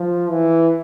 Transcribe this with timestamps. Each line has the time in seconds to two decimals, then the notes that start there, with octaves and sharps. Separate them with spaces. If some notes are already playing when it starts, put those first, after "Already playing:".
Already playing: F3
0.30 E3